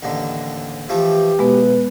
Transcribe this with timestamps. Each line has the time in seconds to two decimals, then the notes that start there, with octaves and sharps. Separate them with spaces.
0.03 A1 D#2 D3
0.89 E3 F3 A3 G4
1.39 B1 G#3 B3 B4